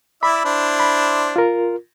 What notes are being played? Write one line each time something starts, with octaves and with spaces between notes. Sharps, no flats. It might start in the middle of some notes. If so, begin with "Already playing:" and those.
E4 D5 E5 B5
D4 E4 C5
B5
F4 A#4